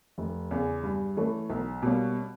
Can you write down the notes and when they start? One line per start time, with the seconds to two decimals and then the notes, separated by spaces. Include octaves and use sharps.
0.18 F1
0.51 E2 C#3
0.83 G2
1.17 E3 A3 C#4
1.50 B1
1.83 B2 G3 A#3 C#4